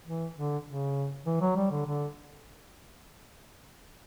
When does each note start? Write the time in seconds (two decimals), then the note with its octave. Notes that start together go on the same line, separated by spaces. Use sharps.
0.06 E3
0.36 D3
0.66 C#3
1.26 E3
1.41 F#3
1.56 G3
1.71 D3
1.86 D3